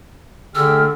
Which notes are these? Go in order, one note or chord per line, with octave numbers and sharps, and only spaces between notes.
D3 A3 G4 G#4 E6 F6